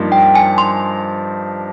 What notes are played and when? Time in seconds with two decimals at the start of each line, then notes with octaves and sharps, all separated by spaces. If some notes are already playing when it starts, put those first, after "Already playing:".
Already playing: G2 F3 A#3 D#4
0.12 G5
0.35 G#5
0.58 C6